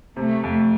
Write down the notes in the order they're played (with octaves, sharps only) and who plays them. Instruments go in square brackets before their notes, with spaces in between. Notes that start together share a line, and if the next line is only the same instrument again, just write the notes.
[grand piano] C3 [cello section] A3
[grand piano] F2